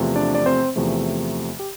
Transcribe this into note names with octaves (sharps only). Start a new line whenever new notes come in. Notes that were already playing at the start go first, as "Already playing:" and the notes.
Already playing: E2 C3 F3 A3
D4 D5
D5
C4 C5
E2 C3 F3 A3
G4